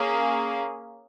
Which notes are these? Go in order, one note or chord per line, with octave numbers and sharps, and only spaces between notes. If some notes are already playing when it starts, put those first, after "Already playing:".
Already playing: A#3 C#4 G#4